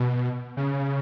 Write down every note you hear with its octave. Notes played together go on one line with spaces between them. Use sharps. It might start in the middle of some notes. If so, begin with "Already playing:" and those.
Already playing: B2
C#3